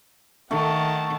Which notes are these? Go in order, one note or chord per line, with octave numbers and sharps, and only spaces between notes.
D#3 A3 F#5 A5